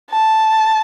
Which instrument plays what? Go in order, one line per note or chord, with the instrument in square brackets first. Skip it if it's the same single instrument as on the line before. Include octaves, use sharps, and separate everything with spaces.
[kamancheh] A5